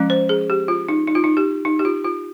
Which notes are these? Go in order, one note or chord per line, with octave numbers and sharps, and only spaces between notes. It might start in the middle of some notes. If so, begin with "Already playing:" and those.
Already playing: F3 G#3 C#4
C5
G#4
G4
F4
D#4
D#4
F4
D#4
G4
D#4
G4
F4
F4